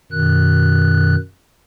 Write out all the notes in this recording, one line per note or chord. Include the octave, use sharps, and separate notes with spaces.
F#2 B2 D#3 F#6